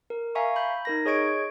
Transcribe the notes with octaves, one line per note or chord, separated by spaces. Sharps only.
A#4
E5 F5 G#5 A#5 C#6
B5 G6
D#4 A#4 A#6
G#4 C#5 D#5 C#6 G#6 D7